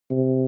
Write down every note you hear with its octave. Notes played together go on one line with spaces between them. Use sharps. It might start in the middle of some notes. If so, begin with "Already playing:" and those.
C3